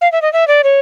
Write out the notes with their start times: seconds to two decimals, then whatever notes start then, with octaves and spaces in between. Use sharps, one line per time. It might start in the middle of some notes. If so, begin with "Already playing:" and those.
0.01 F5
0.12 E5
0.22 D#5
0.33 E5
0.48 D5
0.64 C#5